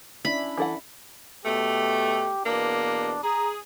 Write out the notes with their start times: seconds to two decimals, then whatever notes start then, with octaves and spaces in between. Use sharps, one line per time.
0.25 C#4 D4 E4 B5
0.58 E3 A4 F#5
1.45 B2 A3 G4
2.45 E2 B2 A#3 D4
3.23 G#4 A#5